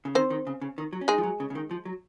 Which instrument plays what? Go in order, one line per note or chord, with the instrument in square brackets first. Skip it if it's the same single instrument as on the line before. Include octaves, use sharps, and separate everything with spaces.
[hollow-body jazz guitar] C#3
[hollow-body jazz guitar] D#3 [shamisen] C4 C5
[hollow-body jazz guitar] D#3
C#3
C#3
D#3
F#3
C#4
[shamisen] G#3 G#4 [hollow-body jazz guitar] D#4
[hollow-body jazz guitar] F3
F#3
C#3
C#3
D#3
F3
F#3